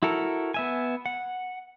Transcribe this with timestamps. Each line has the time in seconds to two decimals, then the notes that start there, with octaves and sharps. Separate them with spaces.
0.03 E4 F#4 A4 A#4
0.54 B3 E5 G#5
1.06 F#5